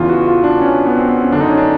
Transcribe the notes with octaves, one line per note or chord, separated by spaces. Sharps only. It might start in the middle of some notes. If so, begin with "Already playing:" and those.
Already playing: E2 C#3 E3 F4
F#4
F4
D4
C#4
B3
C4
B3
C#4
F#2 D3 D4
D#4
C#4
D4